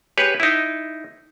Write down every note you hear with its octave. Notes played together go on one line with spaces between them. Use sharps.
G4 G#4 B4 C#5
D#4 E4